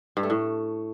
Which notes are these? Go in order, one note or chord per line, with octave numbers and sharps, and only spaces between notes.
G2
A3
A2